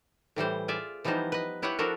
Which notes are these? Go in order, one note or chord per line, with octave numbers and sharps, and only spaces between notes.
A2 E3 G3 C5
F4 G#4 D5 E5
E3 F3 G3 B3 D#4 C5
B4 D#5
B3 E4 G4 B4 C#5 F#5
F3 D4 E4 F#4 A4 A#4